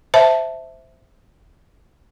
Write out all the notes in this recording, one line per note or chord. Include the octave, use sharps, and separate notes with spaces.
C5 E5 A5